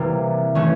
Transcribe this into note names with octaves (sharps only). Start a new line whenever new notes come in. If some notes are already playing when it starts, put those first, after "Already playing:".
Already playing: C3 E3 G3 A#3
E3 A3 C#4